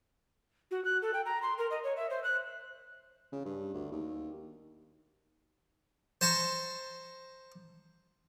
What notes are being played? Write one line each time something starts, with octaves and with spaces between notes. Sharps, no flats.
F#4
F#6
A4
G5
A#5
C6
A#4
D#5
C#5
E5
C5
F#6
C#3
G2
D2
D#2
C5 A5 A#5 C6 C#6